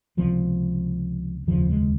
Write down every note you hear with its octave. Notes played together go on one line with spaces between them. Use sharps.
C#2 C3 F3
F1 D#2 C#3 F3
G#3